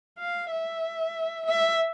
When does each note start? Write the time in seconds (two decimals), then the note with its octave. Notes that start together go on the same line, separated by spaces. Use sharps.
0.18 F5
0.51 E5
1.46 E5